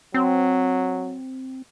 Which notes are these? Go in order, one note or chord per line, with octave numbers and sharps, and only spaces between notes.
F#3 C4